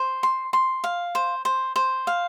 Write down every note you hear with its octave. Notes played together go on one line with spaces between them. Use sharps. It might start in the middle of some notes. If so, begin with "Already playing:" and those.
Already playing: C5
C6
C6
F5
C5
C5
C5
F5